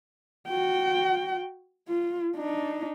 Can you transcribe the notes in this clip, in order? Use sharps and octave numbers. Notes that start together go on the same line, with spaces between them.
F#4 G5
F4
D4 D#4